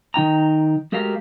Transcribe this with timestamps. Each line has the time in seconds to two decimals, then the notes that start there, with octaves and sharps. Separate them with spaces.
0.14 D#3 D#4 G5 A#5
0.92 G#3 A3 F#4 G4 A#4 F5